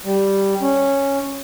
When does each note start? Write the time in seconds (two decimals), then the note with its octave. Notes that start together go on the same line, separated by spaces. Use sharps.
0.05 G3
0.61 C#4